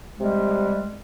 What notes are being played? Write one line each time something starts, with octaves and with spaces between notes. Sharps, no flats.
C3 G3 G#3